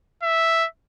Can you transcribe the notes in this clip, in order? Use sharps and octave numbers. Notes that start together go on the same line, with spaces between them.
E5